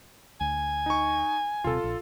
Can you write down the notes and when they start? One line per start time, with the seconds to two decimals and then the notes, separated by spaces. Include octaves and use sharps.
0.41 D2 G#5
0.86 D#4 C#6
1.64 D#1 C3 F4 A4
1.84 A#1